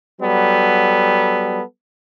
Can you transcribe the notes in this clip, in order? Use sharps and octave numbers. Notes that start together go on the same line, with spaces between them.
F#3 G3 B3 A4